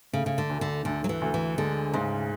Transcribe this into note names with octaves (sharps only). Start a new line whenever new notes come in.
C#3 A3
C#3
D3
D2
D3
D2 D3
F#3
E3
D2
E3
D3 G#3
G#2 C#3